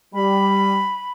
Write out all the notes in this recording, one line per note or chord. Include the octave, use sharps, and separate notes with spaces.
G3 B5